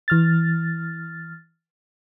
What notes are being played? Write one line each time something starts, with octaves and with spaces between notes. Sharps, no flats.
E3 F6 A6